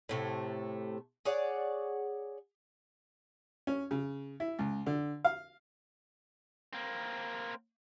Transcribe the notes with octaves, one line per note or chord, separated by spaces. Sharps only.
A2 C3 A3
G#4 C#5 D5 F#5
C#4
C#3
E4
C#2
D3
F5
A#3 C4